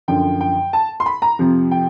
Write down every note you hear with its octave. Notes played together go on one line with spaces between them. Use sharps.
F#2 D3 F3 G5
G5
A5
C6
B5
A#5
F2 C3 F3
G5